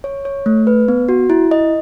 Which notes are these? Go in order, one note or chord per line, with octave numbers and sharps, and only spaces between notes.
C#5
C#5
A3
B4
B3
F#4
E4
D#5